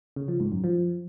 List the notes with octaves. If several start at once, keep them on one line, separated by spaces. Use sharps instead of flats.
C#3
F3
G#2
F#2
F3